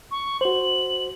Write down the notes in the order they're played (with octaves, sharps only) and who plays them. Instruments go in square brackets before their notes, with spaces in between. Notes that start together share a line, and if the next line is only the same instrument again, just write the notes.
[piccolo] C#6
[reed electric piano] F#4 C5 [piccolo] F#7